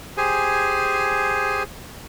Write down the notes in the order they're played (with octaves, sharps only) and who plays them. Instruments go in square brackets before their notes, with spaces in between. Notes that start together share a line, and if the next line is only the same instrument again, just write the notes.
[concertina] G4 G#4 C5 G#5